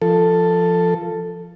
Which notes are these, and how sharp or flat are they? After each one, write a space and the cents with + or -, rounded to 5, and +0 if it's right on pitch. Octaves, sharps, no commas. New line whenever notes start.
F3 -15 A4 +5